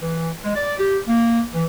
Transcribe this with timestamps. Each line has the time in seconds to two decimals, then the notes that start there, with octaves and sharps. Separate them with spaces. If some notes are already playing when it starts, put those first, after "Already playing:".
0.01 E3
0.43 G#3
0.56 D5
0.78 G4
1.07 A#3
1.54 E3